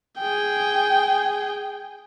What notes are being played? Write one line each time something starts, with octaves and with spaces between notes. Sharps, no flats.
G#4 G5